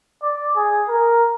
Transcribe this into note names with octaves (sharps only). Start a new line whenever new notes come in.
D5
G#4
A#4